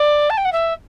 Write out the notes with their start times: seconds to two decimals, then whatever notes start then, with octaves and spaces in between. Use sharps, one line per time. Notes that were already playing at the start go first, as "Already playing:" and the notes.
Already playing: D5
0.30 A5
0.37 G5
0.45 F#5
0.52 E5